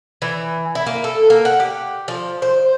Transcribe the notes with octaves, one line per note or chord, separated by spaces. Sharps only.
E3
E4
A#3
A4
A#3
F#5
G4
F3
C5